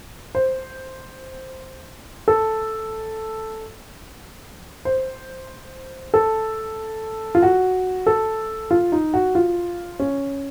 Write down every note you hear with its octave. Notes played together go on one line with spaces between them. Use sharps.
C5
A4
C5
A4
F4
F#4
A4
F4
D#4
F#4
F4
C#4